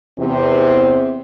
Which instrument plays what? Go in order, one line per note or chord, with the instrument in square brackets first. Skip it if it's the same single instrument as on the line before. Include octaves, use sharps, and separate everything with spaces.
[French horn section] E2 C3 C4